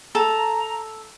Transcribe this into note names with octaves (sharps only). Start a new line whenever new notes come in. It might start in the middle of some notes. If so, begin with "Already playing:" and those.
A4 A#5